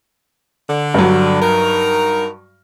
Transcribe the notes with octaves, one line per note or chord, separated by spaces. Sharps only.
D3
G2 F#3
D#4 A#4